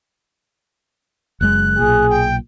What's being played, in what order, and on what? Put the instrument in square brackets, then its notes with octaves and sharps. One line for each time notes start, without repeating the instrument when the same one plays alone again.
[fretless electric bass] F#1 F#2 G#3 [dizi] F#6
[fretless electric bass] B1 A#2 [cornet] G#4
[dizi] G5